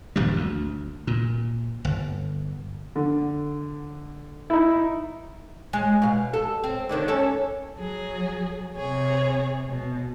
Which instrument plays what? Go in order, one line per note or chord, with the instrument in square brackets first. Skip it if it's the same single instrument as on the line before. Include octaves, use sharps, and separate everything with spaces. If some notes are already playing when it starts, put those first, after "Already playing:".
[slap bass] D#1 A#1 F#2 G3
D2
A#2
G1
[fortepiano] D3
D#4 E4
[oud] G#3
B2 F5
A4
C4
D#2 D3 D#3
C#4 A4
[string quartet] F#3 G#4
C3 G#4 C#5
B2